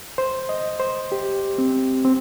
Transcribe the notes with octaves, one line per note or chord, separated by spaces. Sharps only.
C5
D#5
C5
G4
C4
C4